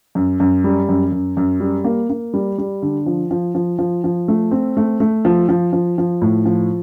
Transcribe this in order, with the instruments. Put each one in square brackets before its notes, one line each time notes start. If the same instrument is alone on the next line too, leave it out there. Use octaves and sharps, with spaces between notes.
[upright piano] F#2
F#2
G3
F#2
F#2
F#2
G3
A#3
A#3
G3
G3
D3
F3
F3
F3
F3
F3
A3
C4
A3
A3
F3
F3
F3
F3
A2
F3